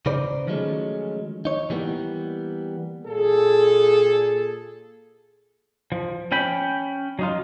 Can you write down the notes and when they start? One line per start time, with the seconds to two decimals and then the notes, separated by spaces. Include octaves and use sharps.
0.06 C#3 D#4 B4 C5 D5
0.47 D#3 F3 F#3 G#3 A3 C#4
1.45 D#4 C#5
1.70 E3 G3 A#3 B3
3.06 A#2 G#4 A4
5.92 F3
6.32 C#4 G5 B5
7.19 F#3 D#4 F4